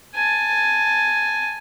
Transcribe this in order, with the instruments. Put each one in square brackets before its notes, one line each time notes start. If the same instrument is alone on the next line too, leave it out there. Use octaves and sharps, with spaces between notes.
[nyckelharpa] G#5 A5